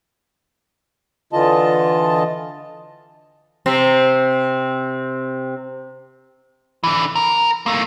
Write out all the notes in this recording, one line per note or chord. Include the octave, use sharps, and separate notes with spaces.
D3 E3 F4 D#5 A5
C3 C4
D3 E3
A#4
A3 A#3